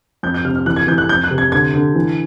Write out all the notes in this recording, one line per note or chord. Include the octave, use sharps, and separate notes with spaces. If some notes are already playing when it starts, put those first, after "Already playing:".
F2 G6
G6
C3 F6
F6
E3 F#6
G#6
E3 G6
F#6
F2 G6
F#6
C3
G#6
D3 G#6
D3
E3